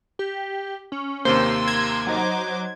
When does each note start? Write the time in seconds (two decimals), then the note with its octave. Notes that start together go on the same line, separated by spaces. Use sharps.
0.19 G4
0.92 C#4
1.25 D#2 C3 A#3 C5 C6 E6
1.68 A#5 G#6
2.07 F#3 D#4 C5 D6